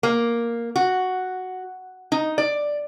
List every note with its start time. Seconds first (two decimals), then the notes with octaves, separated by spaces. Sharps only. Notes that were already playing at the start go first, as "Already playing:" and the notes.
0.03 A#3
0.76 F#4
2.12 D#4
2.38 D5